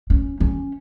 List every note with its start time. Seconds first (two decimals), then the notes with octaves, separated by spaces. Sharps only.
0.10 C#4
0.40 C#4